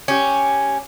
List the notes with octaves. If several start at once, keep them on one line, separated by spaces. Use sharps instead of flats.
C#4 G4